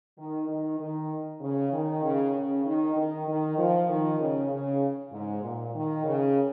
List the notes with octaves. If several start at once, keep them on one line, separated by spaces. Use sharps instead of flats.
D#3
D#3
D#3
C#3
D#3
C#3
C#3
D#3
D#3
D#3
F3
D#3
C#3
C#3
G#2
A#2
D#3
C#3